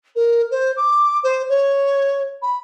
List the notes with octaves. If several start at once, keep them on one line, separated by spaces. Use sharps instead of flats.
A#4
C5
D6
C5
C#5
B5